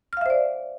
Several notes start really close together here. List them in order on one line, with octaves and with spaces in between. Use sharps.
F6 F5 E5 C5 D5